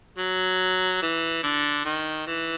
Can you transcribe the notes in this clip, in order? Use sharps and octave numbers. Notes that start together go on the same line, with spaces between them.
F#3
E3
D3
D#3
E3